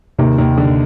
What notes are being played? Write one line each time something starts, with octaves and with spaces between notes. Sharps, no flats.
D#2 C3 D#3
D#2 D#3
D3